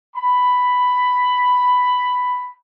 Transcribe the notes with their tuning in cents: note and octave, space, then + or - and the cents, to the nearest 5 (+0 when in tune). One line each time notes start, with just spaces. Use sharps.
B5 +5